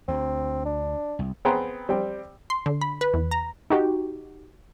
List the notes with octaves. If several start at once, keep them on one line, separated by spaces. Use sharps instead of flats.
D2 C4
D4
C2
B3 C4 G#4 G5 A#5 C6
G3 C4 G5
C6
D3
B5
B4
E2
A#5
D#4 F#4 G4